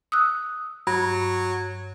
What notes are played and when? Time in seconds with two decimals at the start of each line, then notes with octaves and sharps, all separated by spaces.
0.12 D#6 E6 F#6
0.87 G2 F#3